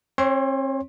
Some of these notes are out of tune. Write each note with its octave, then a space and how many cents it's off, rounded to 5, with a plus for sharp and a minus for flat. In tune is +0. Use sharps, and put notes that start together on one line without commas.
C4 +40 C#5 +0 C6 +25